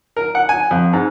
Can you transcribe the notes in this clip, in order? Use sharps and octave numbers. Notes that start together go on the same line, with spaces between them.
A#4
F#5
G#5
F2
G#2